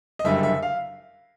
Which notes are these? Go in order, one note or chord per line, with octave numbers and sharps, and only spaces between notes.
D#5
F#1 F#2 D3 G3 E5
E5
F5